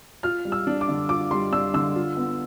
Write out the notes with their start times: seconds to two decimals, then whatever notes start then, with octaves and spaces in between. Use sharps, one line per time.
0.23 F4 F6
0.45 G3
0.52 E6
0.67 D4
0.81 D6
0.89 D3
1.09 F4 D6
1.31 G3 C6
1.52 D4 E6
1.74 D3 E6
1.96 F4
2.17 B3